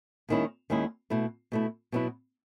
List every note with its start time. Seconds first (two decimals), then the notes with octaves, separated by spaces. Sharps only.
0.29 D#2 D#3 G#3 C#4 E4
0.70 D#2 D#3 G#3 C#4 E4
1.10 B2 A3 E4
1.52 B2 A3 E4
1.92 B2 F#3 B3 E4